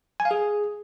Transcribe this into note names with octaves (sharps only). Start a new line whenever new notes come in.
G#5
F5
G#4